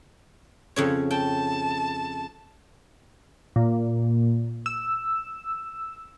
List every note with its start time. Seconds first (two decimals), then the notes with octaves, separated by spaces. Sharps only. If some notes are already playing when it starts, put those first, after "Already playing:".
0.76 F2 C#3 C#5
1.11 G5 A5
3.56 A#2
4.66 E6